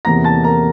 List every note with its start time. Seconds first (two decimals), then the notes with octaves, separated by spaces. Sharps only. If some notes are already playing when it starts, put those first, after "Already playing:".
0.05 E2 C3 E3 A#3 A#5 A#6
0.24 A5 A6
0.43 A#4 A#5